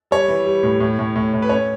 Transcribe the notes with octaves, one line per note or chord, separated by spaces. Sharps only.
G3 C#5
E3
G3
A2
A2
A2
A2
A2
B4
C#4 C#5